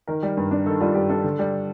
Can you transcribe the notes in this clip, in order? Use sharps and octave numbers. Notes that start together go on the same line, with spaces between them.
D#3 A#4
G3
G2
D4
D#3 A4
G3 F4
G2 G4
D4 A4
D3
G3